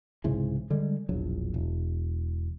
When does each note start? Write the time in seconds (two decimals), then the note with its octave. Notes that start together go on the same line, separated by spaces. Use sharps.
0.24 C2 G#2 C#3 E3
0.70 D3 G3 G#3
1.09 E1 A#1 F#3
1.54 E1